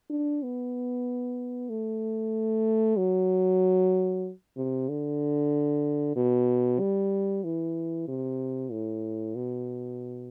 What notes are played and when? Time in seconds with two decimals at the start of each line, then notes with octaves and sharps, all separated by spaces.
0.10 D4
0.43 B3
1.70 A3
2.97 F#3
4.57 C3
4.89 D3
6.16 B2
6.80 G3
7.44 E3
8.08 C3
8.71 A2
9.36 B2